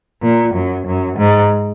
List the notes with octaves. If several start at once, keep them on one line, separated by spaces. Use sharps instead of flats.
A#2
F#2
F#2
G#2